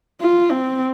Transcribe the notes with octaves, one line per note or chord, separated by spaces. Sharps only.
F4
C4